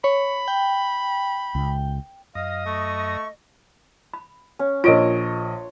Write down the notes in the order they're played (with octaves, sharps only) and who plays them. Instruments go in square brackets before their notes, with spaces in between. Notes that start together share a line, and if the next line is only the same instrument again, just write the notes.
[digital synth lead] C#5 [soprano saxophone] B5
[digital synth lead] G5
[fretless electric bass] C#2
[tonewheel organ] F#2 D#6 A#6 [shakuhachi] D#5 [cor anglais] F5
[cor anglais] A3 [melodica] C#6
[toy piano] B5
[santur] C#4
[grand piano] A#1 D#5 D7 [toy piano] F4 A#4 [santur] C#5 C6